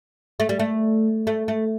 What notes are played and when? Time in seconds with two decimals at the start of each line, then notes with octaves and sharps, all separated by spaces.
0.40 A3
0.49 G3
0.59 A3
1.27 A3
1.48 A3